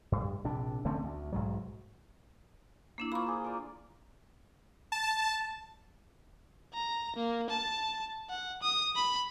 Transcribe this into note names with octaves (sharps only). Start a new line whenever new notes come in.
G2
A#1 C3 D4
D3 A3 C4 C#4
D2
B1 G#2 F#3
A#3 D4 E4 D6
A#3 F4 C5 B5 C#6
G#4 C5
A#4 D5
A5
A#5
A#3
A5
F#5
D#6
B5